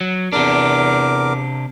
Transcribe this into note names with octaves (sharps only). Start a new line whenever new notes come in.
F#3
E2 C3 D4 A#4 D6